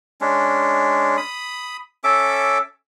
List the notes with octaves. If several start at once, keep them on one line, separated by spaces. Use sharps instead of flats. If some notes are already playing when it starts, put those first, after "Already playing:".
G#3 C#4 D4
B5 D#6
C#4 A4 E5 D6